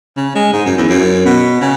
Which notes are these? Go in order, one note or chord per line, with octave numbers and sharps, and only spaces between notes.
C#3
G#3
G#2
F#2
E2
F#2
B2
C#3